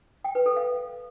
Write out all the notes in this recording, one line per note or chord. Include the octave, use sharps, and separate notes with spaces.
G5
B4
A4
F5